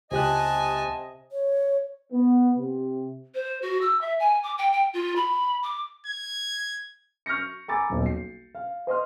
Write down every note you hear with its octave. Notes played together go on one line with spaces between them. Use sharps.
C#2 C3 G4 D#5 G#5 A5 F#6
C#5
B3
C3
C5
F#4
E6
E5
G#5
D6
G5
G5
F4
B5
D6
G#6
C#6 F6 G6 A#6 C#7
G#5 A#5 B5 D6 E6 A6
D#1 B1
C7
F5
C5 D#5 C6 F6